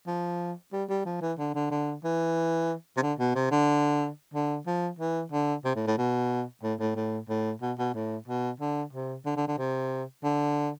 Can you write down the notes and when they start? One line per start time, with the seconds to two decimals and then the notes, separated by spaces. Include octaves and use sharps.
0.07 F3
0.73 G3
0.89 G3
1.05 F3
1.21 E3
1.38 D3
1.55 D3
1.71 D3
2.04 E3
2.97 C3
3.02 D3
3.19 B2
3.35 C3
3.51 D3
4.34 D3
4.66 F3
4.99 E3
5.32 D3
5.65 C3
5.76 A2
5.87 A2
5.98 B2
6.63 A2
6.80 A2
6.96 A2
7.29 A2
7.61 B2
7.79 B2
7.94 A2
8.28 B2
8.60 D3
8.93 C3
9.25 D3
9.36 D3
9.48 D3
9.58 C3
10.24 D3